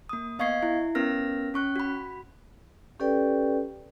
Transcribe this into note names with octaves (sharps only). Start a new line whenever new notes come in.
A#3 D#6
B3 D#5 F5 C#6 G#6 C7
E4
B3 C#4 A#4 F6 A#6
C#4 C#6 F#6
F#4 B5
C#4 G4 A4 B4 D5 G5